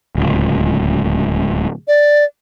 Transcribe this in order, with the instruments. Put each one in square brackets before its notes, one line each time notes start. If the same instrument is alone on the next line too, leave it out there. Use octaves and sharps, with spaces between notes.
[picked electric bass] D1 C#2
[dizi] D5